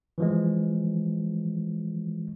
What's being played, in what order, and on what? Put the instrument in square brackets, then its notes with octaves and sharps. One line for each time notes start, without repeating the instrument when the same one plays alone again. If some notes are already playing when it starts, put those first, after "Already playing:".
[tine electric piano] E3 F3 G#3